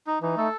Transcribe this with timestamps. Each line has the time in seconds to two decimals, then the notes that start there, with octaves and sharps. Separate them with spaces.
0.07 D#4
0.22 E3 D#4
0.37 A3 A4